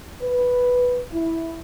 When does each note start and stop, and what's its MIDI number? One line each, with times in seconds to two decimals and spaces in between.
0.21 1.01 71
1.11 1.56 64